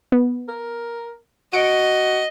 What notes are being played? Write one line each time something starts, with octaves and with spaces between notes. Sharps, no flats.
B3
A#4
F#4 D#5 C#7 D7